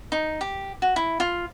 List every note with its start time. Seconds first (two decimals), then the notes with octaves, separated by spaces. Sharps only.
0.12 D#4
0.41 G4
0.82 F#4
0.96 E4
1.20 F4